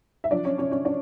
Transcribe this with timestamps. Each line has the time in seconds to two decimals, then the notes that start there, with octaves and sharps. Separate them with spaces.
0.24 E5
0.31 F3 D4 D5
0.44 C#4 C#5
0.58 F3 C#4 C#5
0.71 C#4 C#5
0.85 C#4 D4 D5